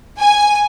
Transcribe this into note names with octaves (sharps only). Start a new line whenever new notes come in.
G#5